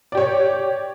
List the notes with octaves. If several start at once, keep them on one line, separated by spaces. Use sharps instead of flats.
G4 C#5 D5